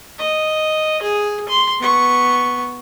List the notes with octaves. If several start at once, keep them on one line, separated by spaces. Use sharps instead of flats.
D#5
G#4
C6
B3 C#6